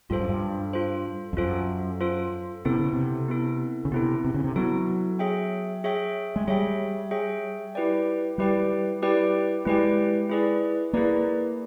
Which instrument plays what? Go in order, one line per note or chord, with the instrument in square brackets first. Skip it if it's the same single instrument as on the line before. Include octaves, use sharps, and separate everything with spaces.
[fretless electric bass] G2 [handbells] F4 A4 C5
[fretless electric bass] F#2
G2
[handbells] F4 A4 C5
[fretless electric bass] F2
[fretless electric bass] F#2 [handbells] F4 A4 C5
[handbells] F4 A4 C5
[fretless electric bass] C3 [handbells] B3 E4 A4
[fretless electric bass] C#3
C3
[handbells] B3 E4 A4
[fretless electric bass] C#3
[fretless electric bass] C3 [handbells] B3 E4 A4
[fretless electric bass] C3
C#3
C3
[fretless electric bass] F#3 [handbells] B3 E4 A4
[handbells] G#4 C#5 E5 G5
G#4 C#5 E5 G5
[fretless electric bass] G#3
[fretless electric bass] G3 [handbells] G#4 C#5 E5 G5
[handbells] G#4 C#5 E5 G5
E4 G4 B4 D5 G5
[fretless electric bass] G3 [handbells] E4 G4 B4 D5 G5
[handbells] E4 G4 B4 D5 G5
[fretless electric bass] G#3 [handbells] E4 G4 B4 D5 G5
[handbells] E4 G#4 B4 D5
[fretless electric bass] A#3 [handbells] E4 G#4 B4 D5